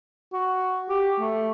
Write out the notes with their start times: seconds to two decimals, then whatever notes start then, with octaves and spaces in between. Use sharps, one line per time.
0.33 F#4
0.89 G4
1.20 A3